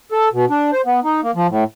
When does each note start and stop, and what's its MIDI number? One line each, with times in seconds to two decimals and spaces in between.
0.12 0.29 69
0.33 0.45 47
0.50 0.71 62
0.73 0.81 72
0.86 1.00 59
1.04 1.21 63
1.23 1.31 58
1.35 1.47 53
1.49 1.64 45